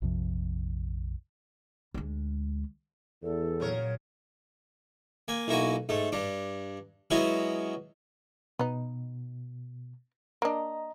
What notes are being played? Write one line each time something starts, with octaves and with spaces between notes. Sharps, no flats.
A#1 F2 C3 F3
D2 G#3
E2 A4
A#2 C#3 F#3 A#4 C#5
A#3 G#5
B1 A#3 E4 F#4 G#5
G#2 A3
G2 D4
F#3 G#3 B3 C#4 E4 F#4
B2 B3 D#4
A#3 D4 D#5 A#5